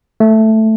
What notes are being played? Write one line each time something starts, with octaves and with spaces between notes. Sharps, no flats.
A3